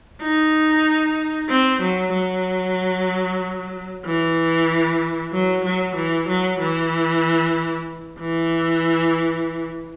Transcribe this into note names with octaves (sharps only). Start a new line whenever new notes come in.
D#4
C4
F#3
F#3
E3
F#3
F#3
E3
F#3
E3
E3